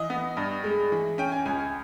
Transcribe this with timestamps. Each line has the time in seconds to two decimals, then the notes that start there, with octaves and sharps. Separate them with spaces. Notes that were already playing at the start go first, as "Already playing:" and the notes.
Already playing: E3 D#5
0.10 B3
0.37 G2
0.64 G#3
0.92 E3
1.18 C#4 G5
1.32 G#5
1.46 C#2 G#5
1.59 G#5